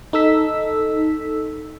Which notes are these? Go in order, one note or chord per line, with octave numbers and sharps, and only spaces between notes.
D#4 A4 E6 B6